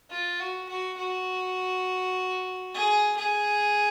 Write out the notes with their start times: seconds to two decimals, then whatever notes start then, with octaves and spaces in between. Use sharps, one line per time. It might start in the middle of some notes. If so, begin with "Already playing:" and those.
0.10 F4
0.40 F#4
0.69 F#4
0.98 F#4
2.74 G#4
3.17 G#4